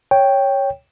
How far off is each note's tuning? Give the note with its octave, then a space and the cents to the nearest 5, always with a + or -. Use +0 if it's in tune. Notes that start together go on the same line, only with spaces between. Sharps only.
C#5 +0 G5 +0